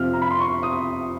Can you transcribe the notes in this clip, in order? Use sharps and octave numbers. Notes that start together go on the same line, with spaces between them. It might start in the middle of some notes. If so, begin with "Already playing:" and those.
Already playing: F2 C3 F3 F6
A#5
B5
C6
C#6
D#6